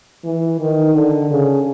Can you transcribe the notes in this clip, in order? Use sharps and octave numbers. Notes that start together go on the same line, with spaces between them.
E3
D#3
D3
C#3